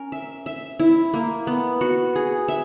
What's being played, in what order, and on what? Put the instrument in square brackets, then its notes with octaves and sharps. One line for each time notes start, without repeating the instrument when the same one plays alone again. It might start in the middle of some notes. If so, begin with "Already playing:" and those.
Already playing: [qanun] C#4 A#4
E5
E5
E4
A#3
B3
F#4
G#4
E5